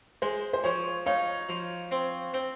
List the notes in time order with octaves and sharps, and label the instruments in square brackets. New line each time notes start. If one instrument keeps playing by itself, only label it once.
[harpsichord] G#3 [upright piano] C5
[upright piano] C5
[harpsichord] F3 [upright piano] C#5
[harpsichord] D#4 [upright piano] C#5 F5
[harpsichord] F3
C4
C4